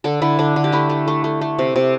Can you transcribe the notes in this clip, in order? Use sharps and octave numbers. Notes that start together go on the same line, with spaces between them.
D3 A4
D3 E4
D3 D4
D3
G4
A3 E4
A3
A3
A3
A3
C3
C3